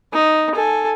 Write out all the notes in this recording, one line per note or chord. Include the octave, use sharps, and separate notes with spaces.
D#4
A4 G#5